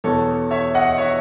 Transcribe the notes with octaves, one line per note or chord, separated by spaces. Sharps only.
E2 B2 A4 C#5
C#5 E5
D#5 F#5
C#5 E5